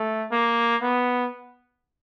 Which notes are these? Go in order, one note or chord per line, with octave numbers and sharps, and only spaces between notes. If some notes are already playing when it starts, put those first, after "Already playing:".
Already playing: A3
A#3
B3